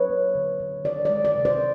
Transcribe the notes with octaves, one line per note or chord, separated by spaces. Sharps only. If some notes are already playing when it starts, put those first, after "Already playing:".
Already playing: F#3 B4 C#5
A#3
D3
D3
D#3 D5
G#3 D5
D5
C3
C5 D5